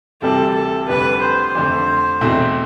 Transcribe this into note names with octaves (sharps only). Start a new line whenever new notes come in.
D2 C3 E3 G3 C4 A4
A4
F1 F2 D3 G3 D4 B4
C5
F2 D3 A3
E2 B2 A3 C4 E4